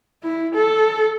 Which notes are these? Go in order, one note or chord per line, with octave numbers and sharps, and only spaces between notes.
E4
A4